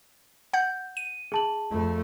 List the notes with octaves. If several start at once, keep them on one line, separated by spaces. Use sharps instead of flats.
F#5 G6
D#7
G#4 A5 F#7
F2 A3